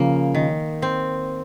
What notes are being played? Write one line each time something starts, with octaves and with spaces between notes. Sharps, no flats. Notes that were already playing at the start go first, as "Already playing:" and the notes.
Already playing: C#3 F3 A#3
D#3
C4